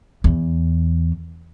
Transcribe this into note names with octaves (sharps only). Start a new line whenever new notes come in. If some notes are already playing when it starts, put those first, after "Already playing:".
E2